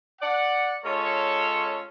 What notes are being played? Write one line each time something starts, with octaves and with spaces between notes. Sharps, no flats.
D5 F#5
G#3 C#4 F4 A4 C#5